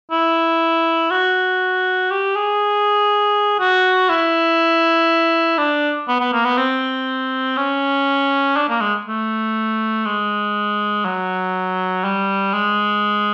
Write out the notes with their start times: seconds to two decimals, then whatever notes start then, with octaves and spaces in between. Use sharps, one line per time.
0.11 E4
1.11 F#4
2.11 G4
2.36 G#4
3.60 F#4
4.09 E4
5.58 D4
6.08 B3
6.20 B3
6.33 A#3
6.45 B3
6.57 C4
7.57 C#4
8.56 D4
8.69 A#3
8.81 G#3
9.06 A3
10.05 G#3
11.05 F#3
12.04 G3
12.53 G#3